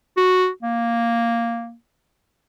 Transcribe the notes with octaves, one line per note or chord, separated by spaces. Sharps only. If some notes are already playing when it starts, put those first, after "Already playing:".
F#4
A#3